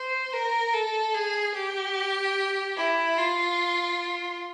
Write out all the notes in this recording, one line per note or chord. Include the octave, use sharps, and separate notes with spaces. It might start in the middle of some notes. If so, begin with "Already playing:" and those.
Already playing: C5
A#4
A4
G#4
G4
E4
F4